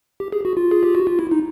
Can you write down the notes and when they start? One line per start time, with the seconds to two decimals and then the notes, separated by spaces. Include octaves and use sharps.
0.20 G4
0.32 G#4
0.45 F#4
0.57 F4
0.71 G#4
0.83 G4
0.95 F#4
1.07 F4
1.19 E4
1.31 D#4